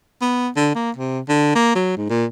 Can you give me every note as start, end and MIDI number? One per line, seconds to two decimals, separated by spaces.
0.21 0.48 59
0.56 0.70 50
0.75 0.91 58
0.96 1.20 48
1.29 1.54 50
1.55 1.75 58
1.75 1.95 54
1.97 2.08 44
2.09 2.25 46